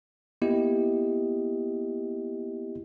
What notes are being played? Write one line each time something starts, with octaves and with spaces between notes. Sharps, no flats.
A#3 B3 E4 G4 D#5